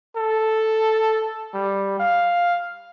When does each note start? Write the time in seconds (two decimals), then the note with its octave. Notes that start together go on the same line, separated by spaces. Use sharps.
0.16 A4
1.54 G3
2.00 F5